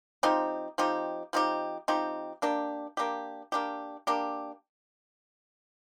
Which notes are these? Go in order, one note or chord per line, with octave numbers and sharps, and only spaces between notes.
F3 C4 D#4 G4
F3 C4 D#4 G4
F3 C4 D#4 G4
F3 C4 D#4 G4
A#3 D4 G4
A#3 D4 G4
A#3 D4 G4
A#3 D4 G4